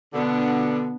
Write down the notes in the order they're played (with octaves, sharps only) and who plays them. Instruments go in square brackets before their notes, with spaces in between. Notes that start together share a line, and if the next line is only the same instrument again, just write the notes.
[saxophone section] B2 D3 [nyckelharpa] B3 D4